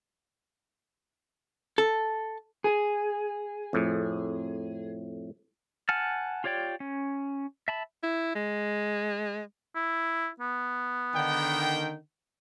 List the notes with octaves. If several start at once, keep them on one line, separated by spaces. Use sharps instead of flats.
A4
G#4
F2 A2
F#5 G#5 A5 F6
F4 G4 C#5 D5 G5
C#4
E5 A5 B5
E4
G#3
E4
B3
D3 D#3 G5